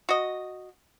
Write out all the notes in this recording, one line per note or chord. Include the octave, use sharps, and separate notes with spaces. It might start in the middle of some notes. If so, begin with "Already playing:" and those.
F#4 D#5